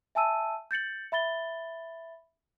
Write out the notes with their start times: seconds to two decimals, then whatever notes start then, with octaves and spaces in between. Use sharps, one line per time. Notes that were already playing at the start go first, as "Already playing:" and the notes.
0.15 E5 G#5 A5 E6 D#7
0.71 G6 A6 C#7 F#7
1.12 E5 B5 A6 G7